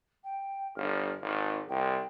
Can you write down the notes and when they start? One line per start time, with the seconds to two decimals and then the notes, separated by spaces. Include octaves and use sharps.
0.24 G5
0.76 G1 F6
1.22 G#1
1.69 C2 G5